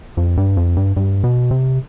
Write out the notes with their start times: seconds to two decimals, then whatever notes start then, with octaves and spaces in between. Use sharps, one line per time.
0.17 F2
0.37 G2
0.57 F2
0.77 G2
0.96 G2
1.24 B2
1.51 C3